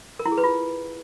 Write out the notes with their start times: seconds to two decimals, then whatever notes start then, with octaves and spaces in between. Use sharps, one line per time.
0.19 A#4
0.25 E4
0.32 G#4
0.38 B4
0.44 F4